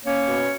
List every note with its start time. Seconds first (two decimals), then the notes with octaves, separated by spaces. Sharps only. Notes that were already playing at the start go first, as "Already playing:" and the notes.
0.04 A#3 C#4 C#5
0.27 B2